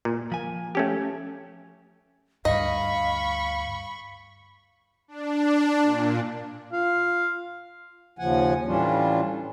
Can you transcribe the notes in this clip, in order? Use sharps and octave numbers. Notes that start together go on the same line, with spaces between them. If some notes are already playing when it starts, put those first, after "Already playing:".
A#2
F3 G#5
A3 C#4 G4
D2 G2 D#5 F5 B5 C#6
D4
A#2
F4 F5
D#2 C#3 F3 F#5 G#5
A2 E3 G3 C#4 D4 F4